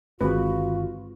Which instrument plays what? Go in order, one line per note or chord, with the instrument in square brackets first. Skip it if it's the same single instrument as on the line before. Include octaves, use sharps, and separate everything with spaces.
[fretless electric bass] G1 D#3 [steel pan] G#3 C4 B4 [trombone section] F4 [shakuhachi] F#4